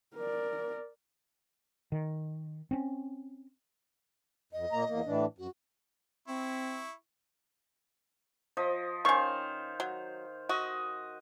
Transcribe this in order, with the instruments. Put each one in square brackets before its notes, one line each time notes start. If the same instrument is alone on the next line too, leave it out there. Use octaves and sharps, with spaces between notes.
[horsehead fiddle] A#4 D5
[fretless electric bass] D#3
C4 C#4
[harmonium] F2 [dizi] D#5
[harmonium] A#2 A#3 A#5
E2 A#3
A2 E3 D4
[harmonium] F#2 [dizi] F#4
[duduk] C4 [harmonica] E4 C#6
[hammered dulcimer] F3 D#5
[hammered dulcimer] D#3 C5 F5 [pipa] C#4 C#6
[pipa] F#3
[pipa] F#4 [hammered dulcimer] D#5